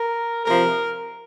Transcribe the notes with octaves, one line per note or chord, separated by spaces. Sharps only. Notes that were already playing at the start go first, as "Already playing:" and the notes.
Already playing: A#4
C3 F3 A#4